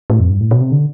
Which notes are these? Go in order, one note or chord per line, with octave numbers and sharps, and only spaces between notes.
A2
F2
G2
A2
B2
C3
D3